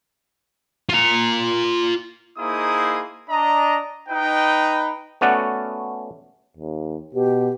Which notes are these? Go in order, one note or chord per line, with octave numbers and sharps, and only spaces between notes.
F4 A#5
A#3 D#4 E4 G#4 C5 D#6
D4 D#5 A#5
D#4 B4 G5
A3 B3 C#4 F#4 D5 F#5
D#2
B2 G4